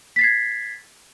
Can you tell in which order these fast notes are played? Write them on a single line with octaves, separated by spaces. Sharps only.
B6 A6 C7 G#6